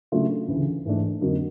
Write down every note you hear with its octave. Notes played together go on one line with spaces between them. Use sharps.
C#3 F#3 A3 D4 F4
D2 C#3 E3
G#2 E3 A3 D4
F2 D3 F#3 A#3 D#4